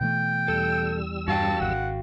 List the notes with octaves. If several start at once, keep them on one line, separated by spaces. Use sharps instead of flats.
B2 E3 A3 G5
E2 G3 A4 E6
G2 F#4 F5 G5 A5
G#1 F#5